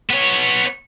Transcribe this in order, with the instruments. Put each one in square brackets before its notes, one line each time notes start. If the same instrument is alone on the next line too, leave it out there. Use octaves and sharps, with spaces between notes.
[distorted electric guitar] B3 C#5